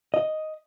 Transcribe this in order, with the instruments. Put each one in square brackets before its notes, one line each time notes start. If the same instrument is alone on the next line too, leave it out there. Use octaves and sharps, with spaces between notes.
[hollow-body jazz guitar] D#5